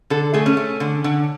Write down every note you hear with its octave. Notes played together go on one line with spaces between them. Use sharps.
D3 A4
A3 G#4
C#4
A3
D3
D3